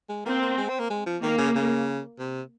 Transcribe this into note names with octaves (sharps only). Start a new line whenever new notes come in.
G#3
A#3 C4
A#3
G#3
C4
A#3
G#3
F3
D#3 A#3
C#3
C#3
C3